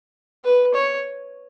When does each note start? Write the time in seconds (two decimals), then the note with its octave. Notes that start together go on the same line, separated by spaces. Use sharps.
0.44 B4
0.75 C#5